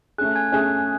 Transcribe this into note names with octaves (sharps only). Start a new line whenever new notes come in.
A3 C#4 G#4 F#6
G#5 G#6
A3 C#4 G#4 F#6